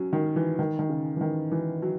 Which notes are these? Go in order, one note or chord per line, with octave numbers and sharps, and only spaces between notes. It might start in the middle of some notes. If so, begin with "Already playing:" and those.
Already playing: F#3 C#4
D#3
E3
D#3
D#3
C#3
E3
D#3
E3
F#3